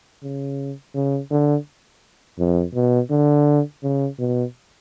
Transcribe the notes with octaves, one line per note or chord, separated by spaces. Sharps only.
C#3
C#3
D3
F2
B2
D3
C#3
B2